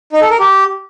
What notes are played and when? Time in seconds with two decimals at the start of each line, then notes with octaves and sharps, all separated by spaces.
0.12 D#4
0.21 A4
0.30 A#4
0.39 G4